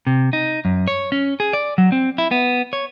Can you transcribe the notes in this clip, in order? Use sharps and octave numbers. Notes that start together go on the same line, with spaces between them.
C3
D#4
F#2
C#5
C#4
G#4
D5
F#3
C4
E4
B3
C#5